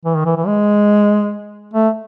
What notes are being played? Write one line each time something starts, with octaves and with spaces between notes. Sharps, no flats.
E3
D#3
E3
E3
G#3
A3